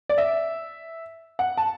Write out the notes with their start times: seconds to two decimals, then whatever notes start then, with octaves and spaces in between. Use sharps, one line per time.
0.09 D5
0.18 E5
1.39 F#5
1.57 A5